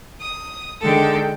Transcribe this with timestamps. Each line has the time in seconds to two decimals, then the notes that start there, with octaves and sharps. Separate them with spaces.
0.20 D#6
0.82 D3 D#3 G#3 A4 G5